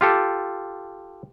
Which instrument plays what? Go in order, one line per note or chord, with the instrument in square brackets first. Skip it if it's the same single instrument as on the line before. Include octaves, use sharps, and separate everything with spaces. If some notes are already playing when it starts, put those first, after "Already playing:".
[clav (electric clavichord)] F4 G4 A4